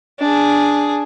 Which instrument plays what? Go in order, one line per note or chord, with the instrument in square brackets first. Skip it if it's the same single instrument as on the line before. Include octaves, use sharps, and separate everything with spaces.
[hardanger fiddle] D4 G#4